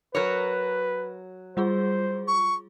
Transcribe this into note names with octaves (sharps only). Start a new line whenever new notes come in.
F#3 A#4 B4 C#5
G3 F4 G#4 C5
C#6